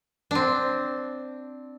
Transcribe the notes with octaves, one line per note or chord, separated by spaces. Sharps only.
C4 D4